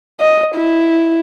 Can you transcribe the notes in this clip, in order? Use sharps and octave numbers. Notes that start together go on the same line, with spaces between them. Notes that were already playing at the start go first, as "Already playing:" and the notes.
D#5
E4